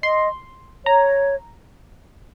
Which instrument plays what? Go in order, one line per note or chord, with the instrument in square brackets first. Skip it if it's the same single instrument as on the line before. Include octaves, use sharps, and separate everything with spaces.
[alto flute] D#5 [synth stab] C6
[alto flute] C#5 [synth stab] A#5